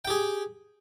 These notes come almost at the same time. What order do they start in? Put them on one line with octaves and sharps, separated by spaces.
G5 G4 G#4